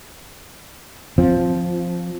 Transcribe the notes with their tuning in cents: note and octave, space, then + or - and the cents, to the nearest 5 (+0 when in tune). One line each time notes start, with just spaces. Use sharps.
F3 +0 C4 +0